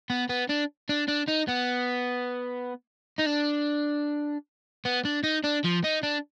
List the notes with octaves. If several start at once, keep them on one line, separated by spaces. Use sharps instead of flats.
B3
B3
D4
D4
D4
D#4
B3
D#4
D4
B3
D4
D#4
D4
F3
D#4
D4